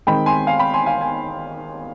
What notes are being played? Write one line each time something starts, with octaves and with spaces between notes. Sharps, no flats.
D#3 G#3 C4 G5 B5
G#5 C6
F5 G#5
G5 B5
G#5 C6
F5 G#5
G#5